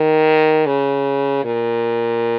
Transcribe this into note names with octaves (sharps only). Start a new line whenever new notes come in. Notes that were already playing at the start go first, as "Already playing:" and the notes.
Already playing: D#3
C#3
A#2